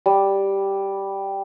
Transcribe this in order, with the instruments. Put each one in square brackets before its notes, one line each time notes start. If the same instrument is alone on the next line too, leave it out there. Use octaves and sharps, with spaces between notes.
[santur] G3